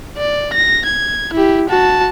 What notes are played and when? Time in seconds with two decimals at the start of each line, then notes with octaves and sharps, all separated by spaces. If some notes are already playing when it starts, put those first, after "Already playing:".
0.17 D5
0.54 A#6
0.85 G#6
1.33 E4 G4
1.69 F#4 A5